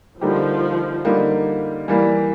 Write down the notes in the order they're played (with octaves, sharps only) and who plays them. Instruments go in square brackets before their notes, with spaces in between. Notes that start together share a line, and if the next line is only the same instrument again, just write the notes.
[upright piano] D3 G3 A#3 D#4 G4 [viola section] F3
[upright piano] D3 G3 A#3 D#4 G4
E3 G3 A#3